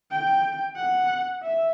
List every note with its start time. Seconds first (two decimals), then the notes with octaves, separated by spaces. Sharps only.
0.11 G5
0.76 F#5
1.42 E5